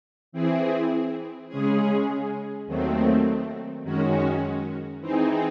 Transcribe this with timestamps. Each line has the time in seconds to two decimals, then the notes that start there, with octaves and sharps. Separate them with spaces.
0.32 E3 C4 E4 G#4
1.49 C#3 G#3 C#4 G#4
2.66 D#2 D#3 F#3 A3 C4
3.84 F#2 D#3 G#3 C#4 F#4
5.00 E3 C4 D#4 G#4